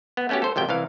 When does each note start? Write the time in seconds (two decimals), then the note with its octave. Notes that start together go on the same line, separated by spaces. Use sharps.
0.17 B3
0.29 A3 B3 C#4 F#4 G4
0.42 A4 C5
0.56 G#1 F2 C3 G5
0.69 C2 E3 F5